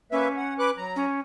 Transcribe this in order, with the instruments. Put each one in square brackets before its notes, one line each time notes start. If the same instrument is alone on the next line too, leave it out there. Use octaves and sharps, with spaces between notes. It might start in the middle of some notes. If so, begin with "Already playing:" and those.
[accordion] A#3 B4 E5 [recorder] C#4
[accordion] F#5
B4 D6 F#6
F#3 A#5
[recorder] C#4